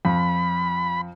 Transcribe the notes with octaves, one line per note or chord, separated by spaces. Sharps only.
F2 B5